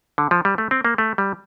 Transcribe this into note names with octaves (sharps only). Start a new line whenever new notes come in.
D3
F3
G3
A3
C4
A#3
A3
G3